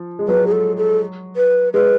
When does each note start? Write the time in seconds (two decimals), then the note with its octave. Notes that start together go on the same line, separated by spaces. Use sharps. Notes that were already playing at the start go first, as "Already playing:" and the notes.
Already playing: F3
0.19 G#3
0.28 F#3 B4
0.47 G#4
0.52 A4
0.77 A4
1.36 B4
1.73 G#3 B4